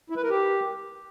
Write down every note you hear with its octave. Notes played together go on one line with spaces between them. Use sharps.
E4
B4
A#4
G4